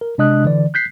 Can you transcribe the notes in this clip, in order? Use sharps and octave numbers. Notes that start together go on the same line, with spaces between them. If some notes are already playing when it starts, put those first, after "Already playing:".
A#4
C3 G#3 D4 D#5 D#6 F#6
D3 E3 D5
F#6 G6 B6 C7